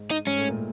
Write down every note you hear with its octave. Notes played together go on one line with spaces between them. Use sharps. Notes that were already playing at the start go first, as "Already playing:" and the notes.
Already playing: G#2 G#3
D#4
G#2 G#3 C#4
A2 A3
A#2 A#3